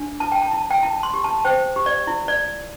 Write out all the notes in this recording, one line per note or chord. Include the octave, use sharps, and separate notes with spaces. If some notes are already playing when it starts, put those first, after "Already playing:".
Already playing: D4
E4 A5
G5
A5
E4
G5
E4 A5
C6
G4
A5
C5 G5
G4
D5
E4
D5